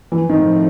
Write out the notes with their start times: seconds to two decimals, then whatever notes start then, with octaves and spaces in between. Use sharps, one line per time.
0.12 E3
0.29 A2 D#3 F3 A3 C4